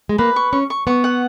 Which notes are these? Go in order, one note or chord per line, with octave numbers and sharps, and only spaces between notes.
G#3
A#3 B4
C#6
C#4 C#6
C#6
B3 C#6
F#5